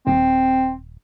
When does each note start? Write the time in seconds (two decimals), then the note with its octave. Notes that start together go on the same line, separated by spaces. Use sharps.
0.07 D#1 C4